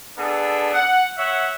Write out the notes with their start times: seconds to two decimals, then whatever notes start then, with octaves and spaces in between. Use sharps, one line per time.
0.18 B3 D4 G#4 A4
0.74 F#5
1.18 C#5 E5 F#5